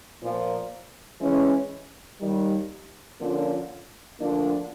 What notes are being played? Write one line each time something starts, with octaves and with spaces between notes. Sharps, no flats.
A#2 F3 A#3
E3 G#3 C#4
D#2 D#3 G3
D3 F3 A#3 C#4 F4
D2 D3 F3 A#3 D4